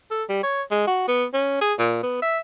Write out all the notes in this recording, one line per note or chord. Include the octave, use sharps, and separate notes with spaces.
A4
G3
C#5
G#3
F#4
B3
C#4
G#4
A#2
B3
E5